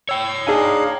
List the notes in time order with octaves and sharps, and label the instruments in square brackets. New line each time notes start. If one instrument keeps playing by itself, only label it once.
[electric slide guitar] C#5 G5 [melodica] E6
[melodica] D4 D#4 F5 [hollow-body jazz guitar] G#4 G#5